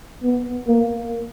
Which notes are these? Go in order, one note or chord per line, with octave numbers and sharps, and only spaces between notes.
B3
A#3